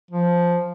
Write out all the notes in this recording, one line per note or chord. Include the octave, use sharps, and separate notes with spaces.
F3